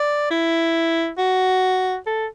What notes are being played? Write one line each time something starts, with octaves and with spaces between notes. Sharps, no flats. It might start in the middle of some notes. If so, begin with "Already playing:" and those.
Already playing: D5
E4
F#4
A4